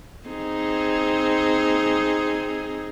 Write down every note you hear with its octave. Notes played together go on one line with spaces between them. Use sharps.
C4 D#4 G#4